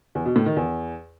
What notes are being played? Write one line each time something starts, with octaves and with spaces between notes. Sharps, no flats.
E2
B2
A2
D#3
E2